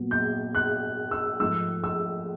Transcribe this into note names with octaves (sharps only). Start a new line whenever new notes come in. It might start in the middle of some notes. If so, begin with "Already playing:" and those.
Already playing: A#2 F#3 B3
G6
F#6
E6
G#2 F3 A3 E6
E6